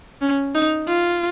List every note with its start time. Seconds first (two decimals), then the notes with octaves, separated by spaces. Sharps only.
0.22 C#4
0.55 D#4
0.88 F4